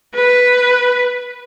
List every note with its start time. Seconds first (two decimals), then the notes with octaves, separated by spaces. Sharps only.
0.15 B4